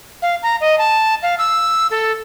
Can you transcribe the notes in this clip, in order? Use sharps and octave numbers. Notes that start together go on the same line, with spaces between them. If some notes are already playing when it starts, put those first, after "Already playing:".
F5
A#5
D#5
A5
F5
E6
A4